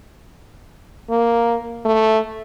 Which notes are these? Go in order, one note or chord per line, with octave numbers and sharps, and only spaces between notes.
A#3
A3